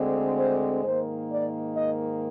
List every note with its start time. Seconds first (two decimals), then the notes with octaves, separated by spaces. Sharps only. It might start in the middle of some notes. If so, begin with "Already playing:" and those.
Already playing: D2 D3 G#3 C4
0.38 C5
0.83 G#2 D#3 A#3 C5
1.31 D5
1.76 D#5